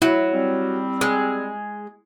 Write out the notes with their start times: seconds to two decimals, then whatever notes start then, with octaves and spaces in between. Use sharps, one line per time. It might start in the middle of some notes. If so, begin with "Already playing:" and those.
0.02 F#3 E4
0.34 G3 C4
1.01 G#3